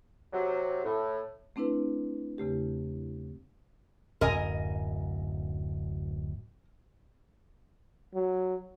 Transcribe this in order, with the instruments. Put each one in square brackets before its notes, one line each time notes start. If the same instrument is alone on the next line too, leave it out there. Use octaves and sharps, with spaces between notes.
[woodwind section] C3 F#3
A2
[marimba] A3 C4 D4 E4 B4
E2 C#3 A3 G4
[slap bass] D1 F#2 [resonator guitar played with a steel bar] A#4 D#5 G#5
[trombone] F#3